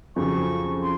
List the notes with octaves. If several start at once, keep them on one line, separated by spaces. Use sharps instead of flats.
F2 C#3 F#3 C#6
C6